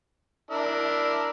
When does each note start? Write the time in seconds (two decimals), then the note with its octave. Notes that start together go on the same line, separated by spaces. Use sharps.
0.51 D4 E4 A#4